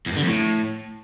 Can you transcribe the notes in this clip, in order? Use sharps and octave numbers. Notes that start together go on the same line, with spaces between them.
E2
G2
D3
F2
A2